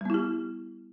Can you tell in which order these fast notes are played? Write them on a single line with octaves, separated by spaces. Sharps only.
G3 B3 E4 G4